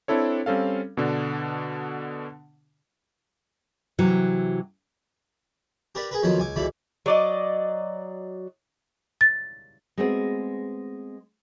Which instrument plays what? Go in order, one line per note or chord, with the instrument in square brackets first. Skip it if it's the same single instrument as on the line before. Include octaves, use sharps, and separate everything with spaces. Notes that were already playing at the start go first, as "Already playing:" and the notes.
[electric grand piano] C4 D4 E4 A4 C#5
G3 C4 C#4 A4 F5
B2 D3 D4
[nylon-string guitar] C3 E3 F#3
[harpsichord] G4 A#4 B4 D5
G#4 A#4 B4
F2 D#3 F3 F#3 B3
C#2 G#5 D6
C#2 B2 D3 E3 D5 B5
[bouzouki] F#3 D5 D#5
[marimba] A6
[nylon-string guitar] G#3 A3 B3 C4 F#4